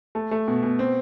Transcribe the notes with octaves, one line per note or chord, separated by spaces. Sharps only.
A3
A3
B2
B2
C4